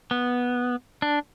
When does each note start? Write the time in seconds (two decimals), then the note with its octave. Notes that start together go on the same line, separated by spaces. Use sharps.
0.11 B3
1.02 D4